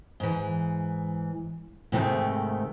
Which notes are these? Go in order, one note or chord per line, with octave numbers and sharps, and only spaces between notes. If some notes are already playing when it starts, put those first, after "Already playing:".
G#2 E3
G#2 C3 D#3 G3 A3